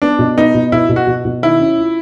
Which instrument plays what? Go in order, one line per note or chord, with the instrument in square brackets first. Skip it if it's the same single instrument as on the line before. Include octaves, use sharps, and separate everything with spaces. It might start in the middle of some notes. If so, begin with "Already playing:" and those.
[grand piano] B3 [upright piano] D4
[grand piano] B2
[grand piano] B3 [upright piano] D#4
[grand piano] B2
[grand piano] B2 [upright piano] E4
[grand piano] B2
[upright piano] F#4
[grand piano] B2
B2
[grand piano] D#3 [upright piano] E4
[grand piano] C#4
F4